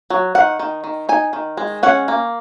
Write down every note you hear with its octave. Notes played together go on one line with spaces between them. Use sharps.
F#3
D#3 F#5
D#3
D#3
D#4 G#5
D#3
G#3
C#4 F#5
A#3